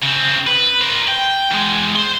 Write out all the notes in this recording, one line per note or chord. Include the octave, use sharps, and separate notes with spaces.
C#3 C4
B4
A#4 C5
G5
E2 G#3
C5 C6